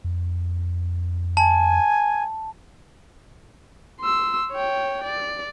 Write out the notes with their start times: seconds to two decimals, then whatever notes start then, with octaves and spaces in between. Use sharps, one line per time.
0.04 F2
1.37 G#5 A5
4.01 C6 E6
4.53 C#5 G5
5.04 D5